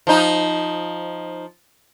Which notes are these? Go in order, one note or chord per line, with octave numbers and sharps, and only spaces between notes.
F3 D#4